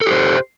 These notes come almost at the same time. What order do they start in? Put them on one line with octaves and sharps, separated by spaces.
A4 G4 C5